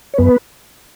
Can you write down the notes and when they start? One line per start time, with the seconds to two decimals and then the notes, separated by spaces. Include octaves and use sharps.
0.14 C#5
0.18 F#2 B3 B4